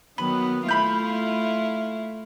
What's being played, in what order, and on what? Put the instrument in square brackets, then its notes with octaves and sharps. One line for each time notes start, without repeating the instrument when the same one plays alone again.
[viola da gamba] D#3 F#3 B3 [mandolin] B4
[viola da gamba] A3 E4 F4 [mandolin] B5 G6